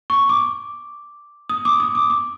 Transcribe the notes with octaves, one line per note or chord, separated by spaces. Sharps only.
C#6
D6
D#6
D6
D#6
D6
D6